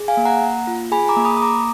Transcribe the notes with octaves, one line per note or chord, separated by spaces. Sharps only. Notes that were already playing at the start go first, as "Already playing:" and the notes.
Already playing: G#4
F5 G#5
A#3
F#5 A#5
A#3
F4
G#4 G#5 B5
A#5 D6
A#3
B5 D#6
D#6
A#3 A#5 D6